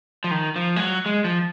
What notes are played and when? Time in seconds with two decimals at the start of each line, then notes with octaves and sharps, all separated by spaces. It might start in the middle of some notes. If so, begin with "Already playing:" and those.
0.24 F3
0.31 D#3
0.56 F3
0.76 G#3
0.80 F#3
1.06 G#3
1.24 F3